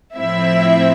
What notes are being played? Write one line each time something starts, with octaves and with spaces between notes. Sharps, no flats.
A2 F3 C4 E4 E5